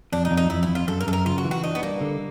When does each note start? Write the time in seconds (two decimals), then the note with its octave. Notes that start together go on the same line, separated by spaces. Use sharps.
0.12 F2 D4
0.25 D#4
0.31 F2
0.37 D#4
0.50 F2 E4
0.63 E4
0.68 F2
0.75 F4
0.88 F#2 A4
1.01 A#4
1.07 F#2 A4
1.13 A#4
1.26 C#3 F4
1.38 F#4
1.45 E3
1.51 F#4
1.64 D4 D#4
1.75 B3
1.82 G3 A#3
2.01 D3